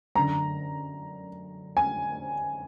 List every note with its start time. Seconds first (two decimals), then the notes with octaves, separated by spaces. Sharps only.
0.16 F#2 D3 A#5
1.77 G#5